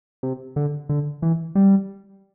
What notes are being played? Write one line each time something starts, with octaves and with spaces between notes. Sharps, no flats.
C3
D3
D3
E3
G3